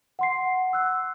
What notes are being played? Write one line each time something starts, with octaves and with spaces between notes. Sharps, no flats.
F#5 C6 C7
E6 F#6